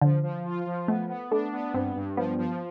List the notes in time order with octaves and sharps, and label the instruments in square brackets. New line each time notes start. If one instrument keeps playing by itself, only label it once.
[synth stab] D3 [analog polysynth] F3
[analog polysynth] F3
F4
F3
[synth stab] A3 [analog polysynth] B3
[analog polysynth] B3
[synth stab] A3 [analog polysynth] D4
[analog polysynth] B3
[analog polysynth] G2 [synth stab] C4
[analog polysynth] G2
[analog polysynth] F3 [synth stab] B3
[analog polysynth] F3